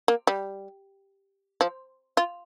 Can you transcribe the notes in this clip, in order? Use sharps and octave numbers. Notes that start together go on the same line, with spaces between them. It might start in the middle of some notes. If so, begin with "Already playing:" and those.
A#3
G3
F3
F4